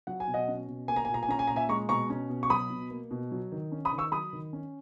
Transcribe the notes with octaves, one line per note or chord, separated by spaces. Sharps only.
F#3 F#5
G#5
B2
D#5 F#5
C#4
B2
A#3 G#5
A#5
G#5
A#2
A#5
G#5
C#4 A#5
G#5
A#2 A#5
E5 G#5
G#3 A#5 C#6
B2 A#5 C#6
C#4
B2
C#6
F#3 B5 D#6
B2
A#3
B2
F#3
D#3
C#4
B5 D#6
D#3
C#6 E6
F#3 B5 D#6
D#3
C#4